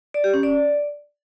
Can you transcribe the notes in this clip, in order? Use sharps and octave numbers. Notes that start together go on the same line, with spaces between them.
D5
G4
C#4
D5